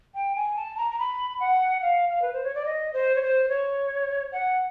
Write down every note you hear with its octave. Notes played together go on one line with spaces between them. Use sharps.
G5
G#5
A5
A#5
A#5
B5
F#5
F5
F5
B4
C5
C#5
D5
D#5
C5
C#5
C5
C#5
F#5